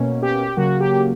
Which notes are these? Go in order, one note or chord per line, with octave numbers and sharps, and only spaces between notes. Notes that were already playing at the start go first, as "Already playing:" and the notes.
Already playing: B2 A#3 C#4
G4
C#3 F#3 A#3 F#4
G4